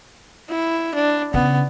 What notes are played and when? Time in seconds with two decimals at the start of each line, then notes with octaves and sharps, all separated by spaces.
0.50 E4
0.95 D4
1.34 C#3 B3